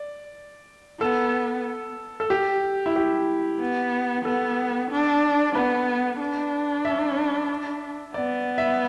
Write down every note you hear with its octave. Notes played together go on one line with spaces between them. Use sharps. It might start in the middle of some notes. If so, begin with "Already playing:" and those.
Already playing: D5
B3 A4
A4
G4
E4
G4
B3
B3 A4
D4
B3 B4
D4
E5
B3 D5
E5